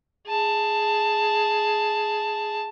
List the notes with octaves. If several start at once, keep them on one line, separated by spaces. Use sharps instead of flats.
G#4 A5